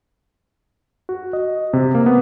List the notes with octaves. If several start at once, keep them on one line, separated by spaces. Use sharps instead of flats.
F#4
D#5
C3
A#3
B3